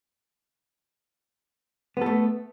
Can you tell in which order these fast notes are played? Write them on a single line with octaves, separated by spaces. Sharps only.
B3 A4 A3